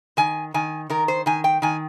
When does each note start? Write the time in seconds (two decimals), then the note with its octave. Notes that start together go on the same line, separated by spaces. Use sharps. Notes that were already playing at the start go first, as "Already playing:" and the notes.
0.17 D#3 G#5
0.54 D#3 G#5
0.90 D#3 A#4
1.08 C5
1.26 D#3 G#5
1.44 G5
1.62 D#3 G#5